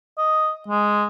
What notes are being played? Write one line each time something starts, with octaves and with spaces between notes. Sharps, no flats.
D#5
G#3